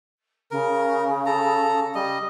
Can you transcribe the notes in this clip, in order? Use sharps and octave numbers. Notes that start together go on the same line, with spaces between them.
C#3 A#4
A4 A#5
G3 D#5